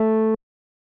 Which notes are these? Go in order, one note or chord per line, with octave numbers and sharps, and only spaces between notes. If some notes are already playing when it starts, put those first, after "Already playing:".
Already playing: A3